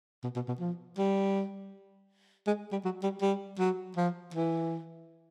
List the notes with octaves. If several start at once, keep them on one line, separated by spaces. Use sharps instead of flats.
B2
B2
B2
F3
G3
G#3
G3
F#3
G3
G3
F#3
F3
E3